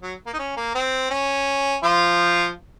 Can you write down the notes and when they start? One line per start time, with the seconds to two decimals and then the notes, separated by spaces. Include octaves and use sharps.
0.02 F#3
0.26 A#3
0.34 D#4
0.39 C#4
0.57 A#3
0.75 C4
1.11 C#4
1.83 F3 F4